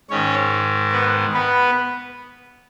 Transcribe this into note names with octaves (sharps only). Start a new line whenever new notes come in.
G#2 D#3 C#4 C#5
B3 B4
B3 B4